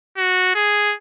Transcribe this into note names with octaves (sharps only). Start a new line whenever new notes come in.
F#4
G#4